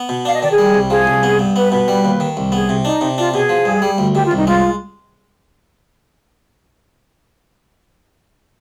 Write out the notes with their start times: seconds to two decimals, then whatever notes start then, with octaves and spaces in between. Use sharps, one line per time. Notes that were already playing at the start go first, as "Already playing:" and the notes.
Already playing: B3
0.09 B2
0.25 D4 F5
0.34 D#5
0.42 D#3 D5
0.51 G#4
0.58 G3
0.74 C2
0.90 F3 G#4
1.07 C2
1.23 B3
1.39 G2
1.56 B3 B4
1.71 B2 B4
1.88 G3
2.05 D#2
2.20 D#3
2.37 C2
2.52 B3 G#4
2.69 C3
2.85 D4 D#4
3.01 C3
3.18 D4 F4
3.34 B2 G#4
3.49 F3
3.65 G2
3.82 G3
3.98 D2
4.15 D#3 G4
4.25 F4
4.31 C2
4.37 D#4
4.47 G#3 F4